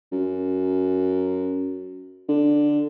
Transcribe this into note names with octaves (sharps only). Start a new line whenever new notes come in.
F#2
D3